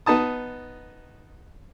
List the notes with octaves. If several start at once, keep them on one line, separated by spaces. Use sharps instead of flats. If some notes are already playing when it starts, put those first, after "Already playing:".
B3 D#4 A5 D#6